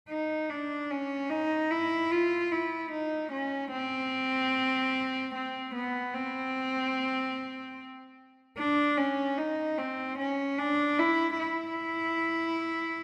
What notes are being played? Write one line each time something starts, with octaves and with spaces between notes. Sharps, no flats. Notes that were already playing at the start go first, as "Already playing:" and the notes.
D#4
D4
C#4
D#4
E4
F4
E4
D#4
C#4
C4
C4
B3
C4
D4
C#4
D#4
C4
C#4
D4
E4
E4